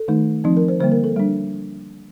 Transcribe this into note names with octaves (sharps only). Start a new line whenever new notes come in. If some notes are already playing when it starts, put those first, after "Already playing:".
Already playing: A4
D#3 A3 D#4
F3 C4 D#4
A#4
C5
D3 G3 A#3 C5
A#4
A4
G3 D4